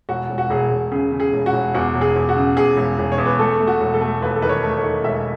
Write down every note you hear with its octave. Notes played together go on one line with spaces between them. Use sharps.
E1 F#4
E1
F#4
E1 G#4
E1
C#3 G#4
C#3
G#4
E1
F#4
E1
E2 F#4
E1
G#4
E2
F#4
C#3
E2 G#4
E1
E1
C#5
E2
B4
A3 A4
A3
F#4
E1
A4
A3
D#2 B4
A4
D#3 B4
C#5
A3
C#5
D#3
E1 E5